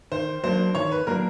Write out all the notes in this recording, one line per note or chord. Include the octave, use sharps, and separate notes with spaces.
D#3 C5
F#3 A#3 D4 C5
D#3 C#5
B4
F#3 A#3 D4 A#4